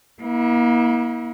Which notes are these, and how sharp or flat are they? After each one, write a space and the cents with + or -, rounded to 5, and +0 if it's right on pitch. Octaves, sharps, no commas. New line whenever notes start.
A#3 +40 E4 -30